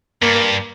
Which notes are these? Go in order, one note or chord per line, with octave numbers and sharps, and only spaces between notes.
G2 A#3